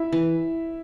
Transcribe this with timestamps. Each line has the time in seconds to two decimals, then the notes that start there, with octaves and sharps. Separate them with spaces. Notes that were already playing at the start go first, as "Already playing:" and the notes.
Already playing: E4 E5
0.13 E3